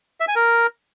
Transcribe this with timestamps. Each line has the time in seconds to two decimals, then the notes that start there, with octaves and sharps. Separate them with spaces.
0.20 E5
0.28 G#5
0.36 A#4